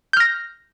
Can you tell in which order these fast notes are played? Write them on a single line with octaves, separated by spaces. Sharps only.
G6 F6 A#6